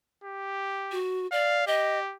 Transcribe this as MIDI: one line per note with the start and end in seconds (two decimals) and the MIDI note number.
0.24 1.00 67
0.92 1.27 66
1.32 1.66 74
1.32 1.66 77
1.67 2.15 67
1.67 1.99 75